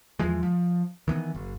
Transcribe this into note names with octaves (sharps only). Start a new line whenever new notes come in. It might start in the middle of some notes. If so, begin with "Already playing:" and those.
E2 E3 F3 G#3
F3
D#3 E3 B3
F#1